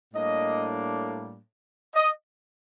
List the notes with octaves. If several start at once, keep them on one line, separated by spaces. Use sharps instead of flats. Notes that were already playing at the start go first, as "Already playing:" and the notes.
A2 G3 A#3 D4 D#5
D#5